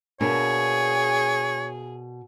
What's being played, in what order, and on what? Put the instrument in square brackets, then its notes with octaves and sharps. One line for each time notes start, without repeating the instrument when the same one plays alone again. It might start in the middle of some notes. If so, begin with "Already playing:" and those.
[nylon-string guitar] B2 A#3 D4 [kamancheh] G#4 [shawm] C#5